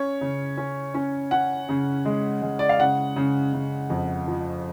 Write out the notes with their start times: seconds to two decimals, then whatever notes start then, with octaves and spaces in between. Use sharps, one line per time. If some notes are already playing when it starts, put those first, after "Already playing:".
Already playing: C#4 C#5
0.21 C#3
0.57 C#4
0.94 C#4
1.31 C#4 F#5
1.69 C#3
2.05 G#3
2.42 G#3
2.59 D5
2.69 F5
2.80 C#3 F#5
3.16 C#3
3.53 C#3
3.90 F2
4.28 F3